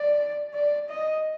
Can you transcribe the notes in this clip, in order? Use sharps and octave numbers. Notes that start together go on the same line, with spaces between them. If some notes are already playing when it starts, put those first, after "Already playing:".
Already playing: D5
D5
D#5